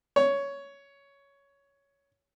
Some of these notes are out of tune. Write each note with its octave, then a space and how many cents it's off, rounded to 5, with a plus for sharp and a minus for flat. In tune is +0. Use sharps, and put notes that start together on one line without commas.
C#5 +10